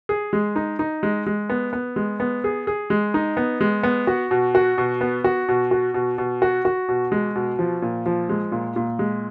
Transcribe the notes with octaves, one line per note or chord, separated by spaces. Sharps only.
G#4
G#3
D#4
D#4
G#3
G#3
B3
B3
G#3
B3
G#4
G#4
G#3
D#4
B3
G#3
B3
F#4
B2
F#4
B2
B3
F#4
B2
F#4
B2
B2
F#4
F#4
B2
G#3
B2
F3
A#2
F3
G#3
A#2
A#2
G#3